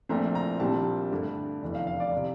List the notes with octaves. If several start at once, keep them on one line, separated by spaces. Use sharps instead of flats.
A#1 A#2 A3 C4 A#5
A#5
A#1 A#2 G3 C4 A5
G2 D3 A3
F1 E2 D3
F5
F5
D5
C3